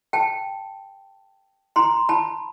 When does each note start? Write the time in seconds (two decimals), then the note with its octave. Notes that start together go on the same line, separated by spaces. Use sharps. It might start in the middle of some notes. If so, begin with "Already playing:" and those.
0.13 G5 A5
1.76 A#5 C6
2.09 A5 B5